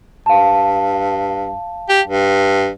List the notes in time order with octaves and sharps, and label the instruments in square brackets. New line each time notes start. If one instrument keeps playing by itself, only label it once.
[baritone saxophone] G2 [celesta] F5 A5
[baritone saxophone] G4
G2